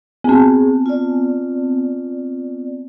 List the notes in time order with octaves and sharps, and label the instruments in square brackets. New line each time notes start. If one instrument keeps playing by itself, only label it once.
[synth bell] B3 C4 [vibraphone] G#4
[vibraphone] F4 D5